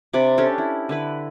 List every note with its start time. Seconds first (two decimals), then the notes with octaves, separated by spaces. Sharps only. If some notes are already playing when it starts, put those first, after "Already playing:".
0.13 C3 D4 D5 B5
0.38 C#4 D4 G4 A4
0.58 E4
0.89 D3 E4 B4